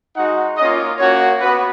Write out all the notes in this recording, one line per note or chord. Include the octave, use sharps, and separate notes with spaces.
G#3 D#4 F#4 F#5
A#3 C#4 F4 D#5
A#3 C#4 F#4 C#5
B3 F#4 B4